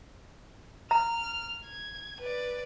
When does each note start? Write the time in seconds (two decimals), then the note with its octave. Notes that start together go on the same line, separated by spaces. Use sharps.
0.91 A#5 F6
1.66 G#6
2.21 B4 D5